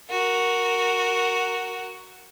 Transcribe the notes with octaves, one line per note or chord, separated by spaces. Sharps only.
F#4 A#4